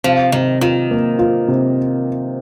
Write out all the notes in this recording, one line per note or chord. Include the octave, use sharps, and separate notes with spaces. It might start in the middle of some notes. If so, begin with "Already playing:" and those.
C3 F3
C3 D#3
D#3 F4
A#3
F4
C3